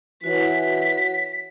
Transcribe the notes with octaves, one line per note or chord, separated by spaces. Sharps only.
E3 F#4 C#5 F#5 B6